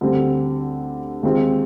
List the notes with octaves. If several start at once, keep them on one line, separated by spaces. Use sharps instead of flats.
D2 D3 G3 C4
D#2 D#3 G#3 C4 F4